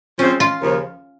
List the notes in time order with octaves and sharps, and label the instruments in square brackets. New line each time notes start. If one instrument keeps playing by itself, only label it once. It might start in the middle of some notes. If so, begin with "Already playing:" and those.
[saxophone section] F3 G#3 C4 [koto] C#4
[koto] F4
[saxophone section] D#2 C#3 F3